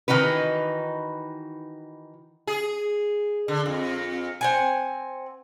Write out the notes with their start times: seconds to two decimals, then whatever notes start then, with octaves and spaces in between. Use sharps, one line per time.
0.08 D#3 E3 D#4 F#4 B4
2.47 G#4
3.48 D3
3.66 F2
4.41 C4 F#5 G#5